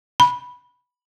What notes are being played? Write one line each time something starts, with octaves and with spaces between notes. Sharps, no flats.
B5